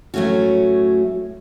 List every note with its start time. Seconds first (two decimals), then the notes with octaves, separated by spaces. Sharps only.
0.14 A2 F#3 A3 C#4 F#4